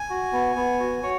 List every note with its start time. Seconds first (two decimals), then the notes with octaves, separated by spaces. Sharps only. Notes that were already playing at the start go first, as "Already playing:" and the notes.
Already playing: G#5
0.10 F#4
0.33 B3
0.56 B3
0.80 F#4
1.03 F#4 C#5